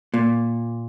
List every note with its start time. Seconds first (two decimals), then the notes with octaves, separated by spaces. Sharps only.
0.14 A#2